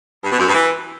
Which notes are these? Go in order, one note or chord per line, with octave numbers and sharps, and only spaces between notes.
G2
B2
F#2
G2
E3